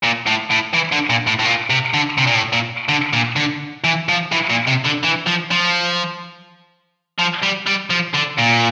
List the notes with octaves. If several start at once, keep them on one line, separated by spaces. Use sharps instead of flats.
A#2
A2
A2
E3
D3
A#2
A2
A2
A#2
C3
D3
C3
A#2
A2
A#2
D3
A#2
D3
E3
F3
E3
A#2
C3
D3
E3
F3
F3
F3
G3
G3
F3
D3
A#2